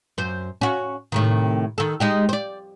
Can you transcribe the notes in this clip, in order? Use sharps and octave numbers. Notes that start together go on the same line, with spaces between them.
F#2 C5
C#4 F#4
A2 C3 D#3
D#3 A4
G#3 D#4 G4
C5 D5